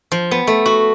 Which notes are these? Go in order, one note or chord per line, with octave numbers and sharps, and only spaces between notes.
F3
B3
A3
F#4